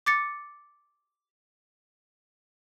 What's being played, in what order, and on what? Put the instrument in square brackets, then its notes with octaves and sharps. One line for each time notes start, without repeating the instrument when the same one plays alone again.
[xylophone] D6 A6 C#7